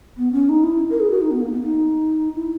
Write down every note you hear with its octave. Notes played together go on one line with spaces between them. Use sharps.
B3
C#4
D#4
E4
A#4
G#4
F#4
D#4
B3
A#3
B3
D#4
E4